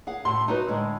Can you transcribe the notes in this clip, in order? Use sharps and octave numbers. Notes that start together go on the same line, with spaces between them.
G#4 F5 F#5
A2 C6
D#4 F#4 B4
A2 D3 G#3